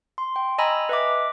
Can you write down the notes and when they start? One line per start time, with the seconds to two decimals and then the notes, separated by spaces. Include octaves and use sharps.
0.18 C6
0.36 G5
0.58 D#5 G#5 A#5 B5 E6
0.89 B4 D#5 E5 D6